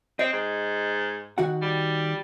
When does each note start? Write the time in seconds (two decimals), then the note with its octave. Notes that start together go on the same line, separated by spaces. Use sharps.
0.19 C4 D#5
0.33 G#2
1.38 D#3 F#4 F#5
1.62 G3